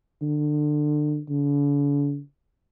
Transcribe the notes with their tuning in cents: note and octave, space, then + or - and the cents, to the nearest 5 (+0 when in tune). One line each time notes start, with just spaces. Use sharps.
D3 +25
D3 -45